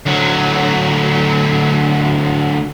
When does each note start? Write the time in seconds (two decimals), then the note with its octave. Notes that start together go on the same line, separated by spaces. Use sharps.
0.06 D2 F#3